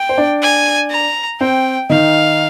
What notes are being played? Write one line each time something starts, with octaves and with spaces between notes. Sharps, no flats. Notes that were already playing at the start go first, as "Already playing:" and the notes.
Already playing: G5
C5
D4 D5
G#5
A#5
C4 C5 G5
D#3 D#4 F5